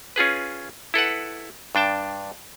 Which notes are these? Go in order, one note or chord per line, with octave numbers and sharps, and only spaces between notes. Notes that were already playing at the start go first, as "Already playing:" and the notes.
C#4 F4 G#4 B4
E4 A4 B4 F#5
G2 D4 G5 A5